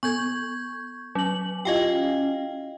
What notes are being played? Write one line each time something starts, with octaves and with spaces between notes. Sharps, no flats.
B3 A4 C#6 G6 G#6
F#3 C#4 F#7
E4 F4 G4 D#5 F5 G5